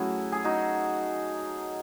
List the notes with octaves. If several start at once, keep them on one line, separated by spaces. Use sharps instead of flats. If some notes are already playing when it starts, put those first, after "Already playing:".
Already playing: F#3 A3 C#4 E4 F#4 G#4
G#4
D#4 F#4